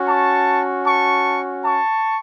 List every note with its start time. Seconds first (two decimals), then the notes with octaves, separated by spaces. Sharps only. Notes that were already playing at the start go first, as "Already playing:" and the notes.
Already playing: C#4 F#4
0.09 A5 C#6
0.86 A5 C#6
1.65 A5 C#6